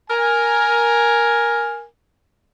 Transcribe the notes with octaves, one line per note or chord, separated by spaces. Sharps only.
A#4 G#5